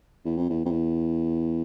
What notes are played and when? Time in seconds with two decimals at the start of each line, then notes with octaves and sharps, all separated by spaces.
0.25 E2
0.37 F2
0.49 E2
0.65 F2
0.71 E2